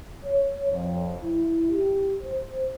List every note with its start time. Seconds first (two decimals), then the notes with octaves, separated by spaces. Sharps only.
0.25 C#5
0.72 F2
1.22 E4
1.71 G4
2.23 C5